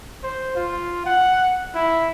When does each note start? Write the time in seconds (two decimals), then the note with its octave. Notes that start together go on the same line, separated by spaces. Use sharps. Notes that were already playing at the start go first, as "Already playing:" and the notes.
0.23 C5
0.56 F4
1.06 F#5
1.75 E4